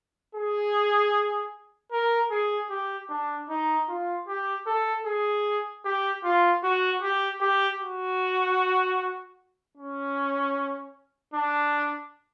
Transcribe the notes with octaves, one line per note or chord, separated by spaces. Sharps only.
G#4
A#4
G#4
G4
D4
D#4
F4
G4
A4
G#4
G4
F4
F#4
G4
G4
F#4
C#4
D4